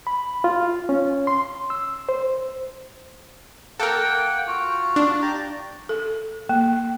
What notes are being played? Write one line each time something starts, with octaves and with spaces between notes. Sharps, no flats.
B5
F4
C#4
C6
E6
C5
A#3 A4 A#4 F#5 G5
F4 F#4
D4
G4 D5 A#5
A4
A#3